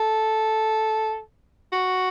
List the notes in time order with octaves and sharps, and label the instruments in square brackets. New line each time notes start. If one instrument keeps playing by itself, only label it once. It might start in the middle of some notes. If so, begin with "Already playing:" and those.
Already playing: [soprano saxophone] A4
F#4